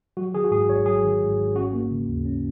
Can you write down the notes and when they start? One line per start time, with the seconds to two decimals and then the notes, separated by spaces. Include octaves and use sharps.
0.17 F#3 F#4
0.34 D#3 G#4
0.44 F#4
0.51 G#2 G#4
0.69 G#1 C#5
0.86 F#3 G#4
1.04 D#3
1.21 G#2
1.38 G#1
1.55 C#4 F#4
1.73 A#3
1.91 C#3
2.08 D#2
2.25 C#4